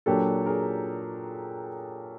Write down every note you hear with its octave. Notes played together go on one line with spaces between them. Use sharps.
A#2 F#3 A#3 D4 G4 A4
G#4 A#4